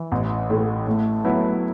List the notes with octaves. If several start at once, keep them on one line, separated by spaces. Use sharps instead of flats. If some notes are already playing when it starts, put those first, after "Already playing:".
Already playing: E3
A1
A2 A3
A2 A3
F#3 B3 E4 B4